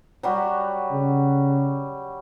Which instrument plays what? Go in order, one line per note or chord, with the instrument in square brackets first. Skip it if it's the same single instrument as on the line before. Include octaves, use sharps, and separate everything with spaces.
[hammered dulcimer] F#3 G3 F#4
[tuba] C#3